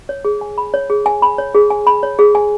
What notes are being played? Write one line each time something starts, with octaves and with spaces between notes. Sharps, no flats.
C#5
G#4
G#5
B5
C#5
G#4
G#5
B5
C#5
G#4
G#5
B5
C#5
G#4
G#5